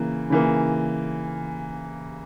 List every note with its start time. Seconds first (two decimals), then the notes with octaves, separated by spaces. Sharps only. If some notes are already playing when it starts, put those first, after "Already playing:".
Already playing: C#3 E3 A#3
0.30 C#3 E3 A#3